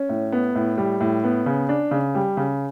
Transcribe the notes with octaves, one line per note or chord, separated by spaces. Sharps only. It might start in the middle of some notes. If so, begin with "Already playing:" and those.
Already playing: C#4
A2
B3
A2
G3
A2
B3
C#3
D4
C#3
G3
C#3